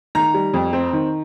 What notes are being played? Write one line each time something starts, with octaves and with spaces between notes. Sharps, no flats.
D#3 A#5
G3
F2
C4
D#3